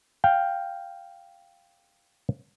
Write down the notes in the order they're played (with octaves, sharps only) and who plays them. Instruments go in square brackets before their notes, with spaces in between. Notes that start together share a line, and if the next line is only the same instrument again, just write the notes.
[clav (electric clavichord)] F5 G5